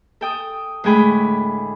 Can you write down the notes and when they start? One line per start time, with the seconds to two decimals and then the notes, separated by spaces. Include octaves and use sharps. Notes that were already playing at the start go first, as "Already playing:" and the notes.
0.21 A4 G5 D#6
0.84 D2 A2 G#3 G#4 G5 B5